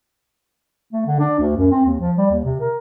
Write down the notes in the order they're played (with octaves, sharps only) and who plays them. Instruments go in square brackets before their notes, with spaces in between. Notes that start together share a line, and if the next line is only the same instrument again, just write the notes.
[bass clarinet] A3
D3
D4
D2
F#2
C4
D#2
F3
G3
D#2
C3
A#4